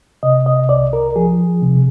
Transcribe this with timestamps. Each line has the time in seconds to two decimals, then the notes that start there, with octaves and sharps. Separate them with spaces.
0.23 C3 D#5
0.46 D#5
0.69 C2 D5
0.93 A#4
1.16 F3 G#4
1.62 C3